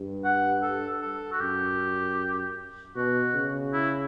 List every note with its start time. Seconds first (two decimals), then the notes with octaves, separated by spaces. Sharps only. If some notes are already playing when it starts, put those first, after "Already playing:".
Already playing: G2
0.24 F#5
0.63 A4
1.02 A4
1.32 F#4
1.41 F#2 G4
2.96 B2 F#4
3.35 C#3
3.73 E4